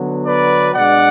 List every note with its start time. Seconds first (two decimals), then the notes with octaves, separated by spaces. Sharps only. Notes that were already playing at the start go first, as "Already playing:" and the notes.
Already playing: D3 F#3 B3
0.26 B4 D5
0.74 B2 G#3 D4 D5 F#5